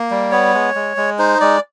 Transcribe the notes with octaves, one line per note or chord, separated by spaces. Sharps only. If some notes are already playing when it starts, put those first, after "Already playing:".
Already playing: A#3
G3
B3 C#5
G#3
G#3
G#3
D#4 C5
G#3 D5